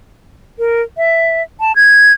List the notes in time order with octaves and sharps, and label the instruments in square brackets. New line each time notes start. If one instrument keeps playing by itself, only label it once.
[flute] A#4
E5
A5
G#6